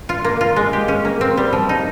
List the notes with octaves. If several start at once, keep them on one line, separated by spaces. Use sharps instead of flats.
F4
A#3
F4
G#3
G4
C#4
A#3
C4
G3
F3
D#4